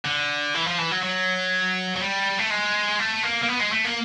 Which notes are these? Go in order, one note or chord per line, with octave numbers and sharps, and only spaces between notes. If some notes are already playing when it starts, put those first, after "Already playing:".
D3
E3
F3
E3
F#3
F#3
F#3
G3
A3
G#3
A3
A#3
A#3
B3
G#3
A3
A#3